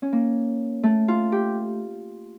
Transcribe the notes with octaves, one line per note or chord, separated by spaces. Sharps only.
C#4
A#3
A3
F4
G4